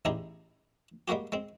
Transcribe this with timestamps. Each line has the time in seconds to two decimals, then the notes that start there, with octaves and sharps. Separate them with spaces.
0.05 A1 E2 D#4 G4 G#4 A#5
1.08 G3 G#3 A#3 F#4 G4
1.32 G#3 C4